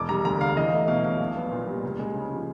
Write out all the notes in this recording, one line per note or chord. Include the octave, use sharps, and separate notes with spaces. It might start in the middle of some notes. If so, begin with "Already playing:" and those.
Already playing: E1 D6
G3 A#5
D2 A#5
D3 F5
E2 D#5
A3
B2 F5
F#3 F5
A#1
B3
A#2
G3
C#2
G#3
C#3
F3